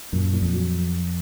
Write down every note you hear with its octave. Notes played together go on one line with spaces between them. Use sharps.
F#2 A#2
A#2
F2
F#3